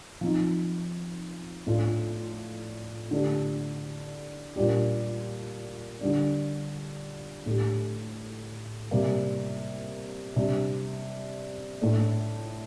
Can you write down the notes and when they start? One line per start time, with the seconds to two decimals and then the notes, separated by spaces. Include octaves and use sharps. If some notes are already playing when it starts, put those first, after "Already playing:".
0.21 F3 C4 D#4
1.67 A2 A3 D4 F4
3.11 D3 A3 D4 G4
4.56 A#2 G3 D4 G4
6.01 D3 G3 D4
7.46 A2 A3 D4 G4
8.91 C3 G3 A#3
10.36 C3 G3 D4
11.81 A2 A3 D4